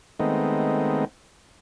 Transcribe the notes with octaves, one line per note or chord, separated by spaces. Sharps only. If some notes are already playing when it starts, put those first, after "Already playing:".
D#3 G#3 A3 B3 C4 D#4